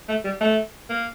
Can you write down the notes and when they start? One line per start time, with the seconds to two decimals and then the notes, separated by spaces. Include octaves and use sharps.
0.08 A3
0.24 G3
0.40 A3
0.89 A#3